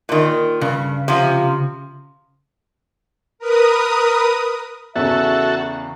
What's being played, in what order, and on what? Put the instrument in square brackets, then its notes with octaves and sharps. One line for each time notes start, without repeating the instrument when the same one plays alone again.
[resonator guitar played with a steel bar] A#2 D#3
[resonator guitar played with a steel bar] G2 [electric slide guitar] C#3
[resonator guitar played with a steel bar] C3 F3
[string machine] A#4 B4 D#6
[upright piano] E2 C#3 [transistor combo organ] F#4 A4 [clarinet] E5